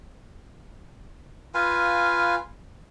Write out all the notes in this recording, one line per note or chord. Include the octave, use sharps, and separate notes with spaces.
F4 B4 F5 G#5